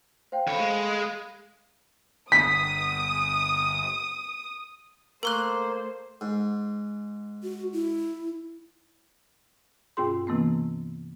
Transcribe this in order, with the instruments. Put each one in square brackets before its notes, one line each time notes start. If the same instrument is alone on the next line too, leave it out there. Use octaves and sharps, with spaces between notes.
[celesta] C5 F5 G5
[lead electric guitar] F2 C#5 [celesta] A4 F5 B5
[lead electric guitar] G#3
[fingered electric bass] G1 [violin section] D#6 [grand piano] B6
[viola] A3 C5 [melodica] A#3 [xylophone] A#4 C#6 F#6
[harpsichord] G#2
[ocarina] F#4
E4
[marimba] G2 B2 C#4 F4 G#4 C6
C3 E3 A#3 B3 C#4